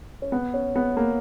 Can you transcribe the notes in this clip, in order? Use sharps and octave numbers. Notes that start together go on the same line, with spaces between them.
C#4
B3
C#4
B3
A#3